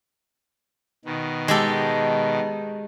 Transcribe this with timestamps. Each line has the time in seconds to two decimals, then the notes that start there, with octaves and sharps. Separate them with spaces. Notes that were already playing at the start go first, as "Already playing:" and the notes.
1.05 B2 D#3
1.48 G#3 G4 A4